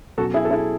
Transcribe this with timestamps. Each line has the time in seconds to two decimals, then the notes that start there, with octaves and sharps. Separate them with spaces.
0.18 B2 F#3 C#4 F#4 A4
0.34 E4 G#4
0.45 A4
0.51 E4 G#4